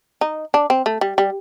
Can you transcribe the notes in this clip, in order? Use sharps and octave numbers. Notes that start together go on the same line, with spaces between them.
D#4
D4
C4
A3
G3
G3